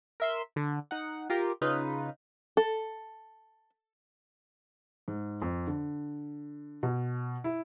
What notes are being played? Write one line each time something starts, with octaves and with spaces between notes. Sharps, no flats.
A#4 E5 C6
D3
D#4 F#5
F4 G4 A#4
C#3 D#4 F4 B4
A4
G#2
F2
D3
B2
E4